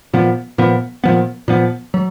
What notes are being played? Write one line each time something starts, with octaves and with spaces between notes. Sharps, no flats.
A#2 F3 B3
A#2 F3 B3
A#2 F3 B3
A#2 F3 B3
F#3